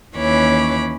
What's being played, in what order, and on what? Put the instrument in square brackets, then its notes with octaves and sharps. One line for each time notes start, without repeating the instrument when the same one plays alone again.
[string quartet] D#2 E3 C#4 C#5 B5 D6